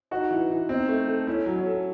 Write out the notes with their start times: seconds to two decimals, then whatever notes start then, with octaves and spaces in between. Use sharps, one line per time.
0.11 D#4 F#4
0.31 E3
0.50 E3
0.69 C4 D#4
0.89 A3
1.08 A4
1.27 C#4 E4
1.46 F#3
1.56 C#4
1.66 A4